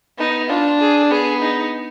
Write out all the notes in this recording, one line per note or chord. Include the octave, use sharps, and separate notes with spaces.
B3 D#4
D4 F4
G#4
B3 G#4
D#4